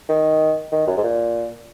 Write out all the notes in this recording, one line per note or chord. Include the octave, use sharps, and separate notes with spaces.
D#3
D#3
F#2
G#2
A#2